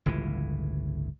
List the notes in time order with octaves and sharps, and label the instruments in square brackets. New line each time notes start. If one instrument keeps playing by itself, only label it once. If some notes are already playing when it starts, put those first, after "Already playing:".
[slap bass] G1 C#2 A2 E3